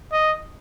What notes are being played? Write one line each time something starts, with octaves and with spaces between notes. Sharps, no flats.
D#5